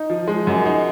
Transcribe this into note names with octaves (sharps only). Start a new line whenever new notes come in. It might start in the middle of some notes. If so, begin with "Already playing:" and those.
Already playing: D#4
F3
G#3
F#2
D#4